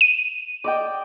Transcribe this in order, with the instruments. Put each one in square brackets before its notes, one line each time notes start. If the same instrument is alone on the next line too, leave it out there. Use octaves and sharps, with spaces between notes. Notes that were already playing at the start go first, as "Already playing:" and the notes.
[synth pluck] D#7
[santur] D5 D#5 G5